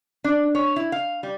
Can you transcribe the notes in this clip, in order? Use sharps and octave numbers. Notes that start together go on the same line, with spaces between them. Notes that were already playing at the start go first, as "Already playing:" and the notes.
D4
C#5
E4
F5
G3